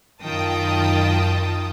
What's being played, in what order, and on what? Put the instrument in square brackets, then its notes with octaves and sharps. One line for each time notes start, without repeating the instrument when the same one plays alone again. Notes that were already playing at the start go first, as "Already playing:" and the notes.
[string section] F#2 D#3 F4 G5 A5 D#6